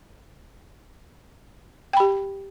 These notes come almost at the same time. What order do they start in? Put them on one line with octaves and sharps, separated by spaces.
G5 B5 G4